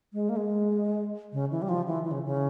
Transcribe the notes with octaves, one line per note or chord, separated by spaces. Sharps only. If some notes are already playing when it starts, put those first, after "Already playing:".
G#3
A#3
G#3
C#3
E3
G3
F3
E3
E3
C#3
C#3